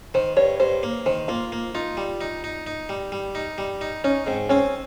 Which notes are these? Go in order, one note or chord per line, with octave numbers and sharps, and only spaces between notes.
D#3 C5
G2 C#5
G2 C5
A#3
D#3 C5
A#3 F4
A#3
D#4 F4
G3
D#4
D#4
D#4
G3
G3
D#4
G3
D#4
C#4 D#4
G#2 C4
C4 C#4